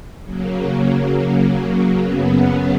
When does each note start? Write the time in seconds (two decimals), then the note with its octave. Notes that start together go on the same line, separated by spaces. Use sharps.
0.22 C#3 F#3 A#3
1.98 F#2 C#3 F#3 B3